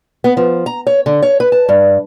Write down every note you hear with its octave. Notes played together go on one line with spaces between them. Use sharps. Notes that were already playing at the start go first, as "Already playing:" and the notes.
B3
F3
A#5
C#5
D3
C#5
B4
A5
G2